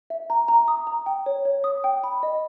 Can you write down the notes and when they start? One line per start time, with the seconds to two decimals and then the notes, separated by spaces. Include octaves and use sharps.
0.10 E5
0.30 A#5
0.48 A#5
0.68 D#6
0.87 A#5
1.06 G5
1.26 C#5
1.45 C#5
1.64 D#6
1.84 G5
2.04 B5
2.23 D#5